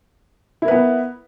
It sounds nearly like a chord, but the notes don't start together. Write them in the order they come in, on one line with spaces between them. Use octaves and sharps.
E4 A#4 B4 B3